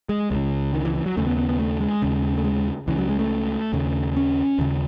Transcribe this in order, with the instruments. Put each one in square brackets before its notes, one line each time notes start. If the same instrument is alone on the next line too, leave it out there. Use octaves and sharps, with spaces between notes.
[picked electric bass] G#3
C#2 C#3 G#3
D#3
E3
E3
F#3
D#2 C#3 A3
B3
B3
B3
A3
G#3
D#2 C#3
A3
G#3
C#2 C#3 E3
F#3
G#3
A3
D#2 C#3
C#4
D#2 C#3